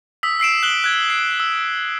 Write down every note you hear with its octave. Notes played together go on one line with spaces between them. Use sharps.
D#6 E6 B6
E6 C7 D7 E7
F#6 F#7 G7
F#6 G#6
C7
E6